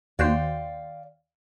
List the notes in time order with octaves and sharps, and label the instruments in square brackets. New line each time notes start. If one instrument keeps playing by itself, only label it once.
[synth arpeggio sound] D#2 F#4 C5 [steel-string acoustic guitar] D5 F5 G5